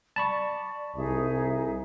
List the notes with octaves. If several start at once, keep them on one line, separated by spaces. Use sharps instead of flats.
D5 A5 B5 C#6
C2 D#4 G#4 E5